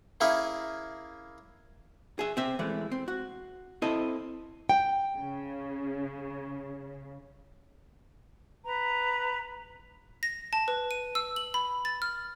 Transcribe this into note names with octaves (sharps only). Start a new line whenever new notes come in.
A#3 C#4 E4 G#4 A#4
G#4 E5
C4 E5
E3 G#3 A3
C4
F#4
C4 E4 A4 D#5
G5
C#3
B4 A#5
A#6
A5
B4
D#7
E6
F#7
B5
A6
F6